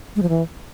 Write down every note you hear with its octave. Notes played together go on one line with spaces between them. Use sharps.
G#3
F3
E3